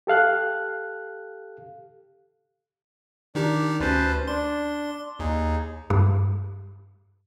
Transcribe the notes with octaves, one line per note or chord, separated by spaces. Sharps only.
G4 A4 F5 F#6
D#3 D4 D#4 G4
D2 C#4 B4 C5 A5
D4 C6
D#2 D#4 G#4
G2